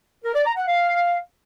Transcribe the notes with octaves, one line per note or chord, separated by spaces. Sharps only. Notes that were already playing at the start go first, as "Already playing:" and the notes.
A#4
D5
A#5
F#5
F5